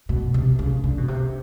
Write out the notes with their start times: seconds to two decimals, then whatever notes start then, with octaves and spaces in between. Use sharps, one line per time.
0.09 B2
0.34 C3
0.59 C#3
0.84 D3
0.98 B2
1.08 C3